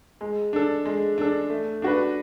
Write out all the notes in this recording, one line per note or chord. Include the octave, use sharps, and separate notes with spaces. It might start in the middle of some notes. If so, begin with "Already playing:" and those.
G#3
D4 A4
G#3
D4 A4
A3
D4 F#4 B4